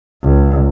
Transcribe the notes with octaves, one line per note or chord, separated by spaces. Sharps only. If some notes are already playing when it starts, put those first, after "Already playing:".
C#2